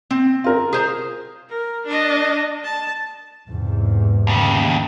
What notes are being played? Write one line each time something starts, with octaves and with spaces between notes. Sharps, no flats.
C4
F4 A#4
G#4 C5 A#5
A#4
D4 D#5
A5
E2 G#2 C3
D#2 C#3